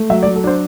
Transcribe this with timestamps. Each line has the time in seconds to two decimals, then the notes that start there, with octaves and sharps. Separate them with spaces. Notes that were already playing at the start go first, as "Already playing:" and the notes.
Already playing: A3
0.10 F#3 E5
0.23 D5
0.26 F#3
0.36 A4
0.44 D4 C5